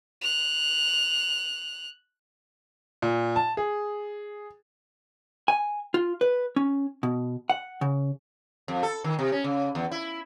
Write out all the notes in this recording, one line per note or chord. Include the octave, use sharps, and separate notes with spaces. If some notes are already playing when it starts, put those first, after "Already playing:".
F#6 F7
A#2
A5
G#4
G#5
F4
B4
C#4
B2
F#5
C#3
F2
A4
D#3
C3
C#4
C#3
E2
E4